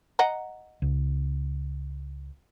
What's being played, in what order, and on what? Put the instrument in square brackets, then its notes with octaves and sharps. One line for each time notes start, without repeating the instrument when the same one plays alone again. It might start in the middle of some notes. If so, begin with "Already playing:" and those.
[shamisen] D#5 F#5 A#5
[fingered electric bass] C#2